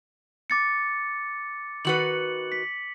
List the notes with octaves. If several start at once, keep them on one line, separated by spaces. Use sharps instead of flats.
D6 A6 C#7
D#3 F#4 B4 C#7 F#7
B6